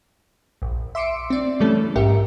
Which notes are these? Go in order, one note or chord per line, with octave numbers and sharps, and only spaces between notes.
A#1
E5 C6 D6 E6 C#7 D7
C4 D5
C#3 E3 G3 A3 C#4 A4
A1 G#2 G4 A#4 E5 C#7